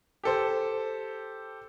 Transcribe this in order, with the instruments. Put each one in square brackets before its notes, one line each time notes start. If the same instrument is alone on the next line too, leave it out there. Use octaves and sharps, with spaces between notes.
[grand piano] G4 A4 C5